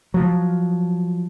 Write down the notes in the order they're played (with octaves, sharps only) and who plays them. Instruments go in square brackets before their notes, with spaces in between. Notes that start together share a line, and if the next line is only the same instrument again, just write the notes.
[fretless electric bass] F3 F#3